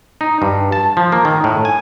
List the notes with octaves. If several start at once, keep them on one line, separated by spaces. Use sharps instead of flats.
D#4
G2
A5
F3
A#3
D#3
A2
G#5